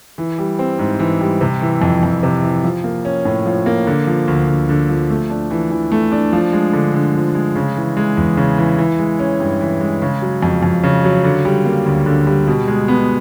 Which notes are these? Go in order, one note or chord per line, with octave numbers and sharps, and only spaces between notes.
E3
G3
C4
G#2
E3
G3
C3
E3
F2
F2
C3
E3
F3
A#3
C#4
A2
F3
A#3
D3
F3
D2
D2
D3
F3
A3
D4
E3
E3
A3
D4
F3
G#3
D3
D3
F3
G#3
C#3
E3
G#3
E2
C#3
E3
E3
G#3
C#4
G2
E3
G#3
C#3
F#3
F2
F2
C#3
F#3
D3
G3
A#3
D2
D3
G3
B2
G#3
B3